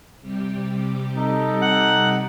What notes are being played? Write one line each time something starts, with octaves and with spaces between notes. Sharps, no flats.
C3 G3 G4
D#4 A4
F#5 F#6